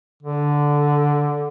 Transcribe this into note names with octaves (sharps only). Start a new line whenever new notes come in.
D3